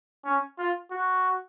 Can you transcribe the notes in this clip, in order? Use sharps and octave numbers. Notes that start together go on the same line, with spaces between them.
C#4
F4
F#4